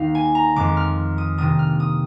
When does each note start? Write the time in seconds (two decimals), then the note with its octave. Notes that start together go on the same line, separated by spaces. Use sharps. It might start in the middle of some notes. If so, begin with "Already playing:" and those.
Already playing: D#2 D#3 A#3 D#4 F5
0.15 G#5
0.35 A#5
0.56 F2 D#3 G#3 D6
0.77 F6
1.18 D#6
1.38 C3 D#3 A#3 D4 D#6
1.59 F6
1.80 D#6